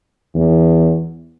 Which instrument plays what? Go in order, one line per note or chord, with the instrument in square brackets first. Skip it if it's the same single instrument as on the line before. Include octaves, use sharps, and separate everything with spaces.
[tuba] E2